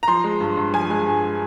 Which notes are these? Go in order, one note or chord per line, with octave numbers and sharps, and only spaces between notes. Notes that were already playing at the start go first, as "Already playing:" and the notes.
A#5
F3 C6
G#3
G2
G2
F3 G#5
G#3
G2